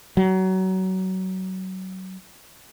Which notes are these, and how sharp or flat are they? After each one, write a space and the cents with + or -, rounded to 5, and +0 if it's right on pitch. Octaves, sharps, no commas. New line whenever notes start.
F#3 +25